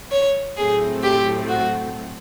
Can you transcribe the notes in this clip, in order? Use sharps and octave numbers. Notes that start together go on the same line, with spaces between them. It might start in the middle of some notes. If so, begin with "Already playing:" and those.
C#5
A2 F#3 A3 C4 G#4
G4
F#4